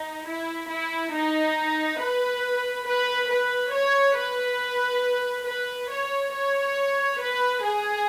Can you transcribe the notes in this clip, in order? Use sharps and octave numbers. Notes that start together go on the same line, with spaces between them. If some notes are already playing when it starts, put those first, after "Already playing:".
Already playing: D#4
E4
E4
D#4
B4
B4
B4
C#5
B4
B4
C#5
C#5
B4
G#4